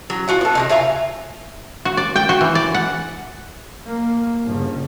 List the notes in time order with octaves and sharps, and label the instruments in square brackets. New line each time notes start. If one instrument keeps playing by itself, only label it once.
[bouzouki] F#3
F4 F#4 F#5
B3 A4
C3 D#3 D#4
F4 E5 G#5 A#5
[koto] F#4
D5
G5
F#4
E3
D5
F#5
[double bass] A#3
G1 C#3